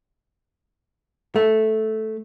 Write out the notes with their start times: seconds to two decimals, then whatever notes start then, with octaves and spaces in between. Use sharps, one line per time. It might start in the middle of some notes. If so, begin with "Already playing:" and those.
1.36 A3